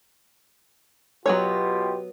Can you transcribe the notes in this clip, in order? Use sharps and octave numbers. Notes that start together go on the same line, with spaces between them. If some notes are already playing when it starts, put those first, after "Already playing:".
B2 F#3 B3 F4 G4 C#5